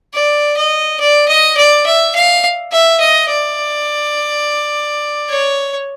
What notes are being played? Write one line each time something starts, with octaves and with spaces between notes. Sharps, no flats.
D5
D#5
D5
D#5
D5
E5
F5
E5
D#5
D5
C#5